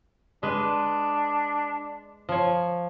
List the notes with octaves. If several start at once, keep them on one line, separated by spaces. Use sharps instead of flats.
G#3 D4 B4
F3 C#5